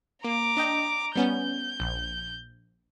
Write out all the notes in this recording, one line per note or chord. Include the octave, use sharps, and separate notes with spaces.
A#3 A#5 D6
D4 D#5 G5
G3 B3 C#4 G6
A#1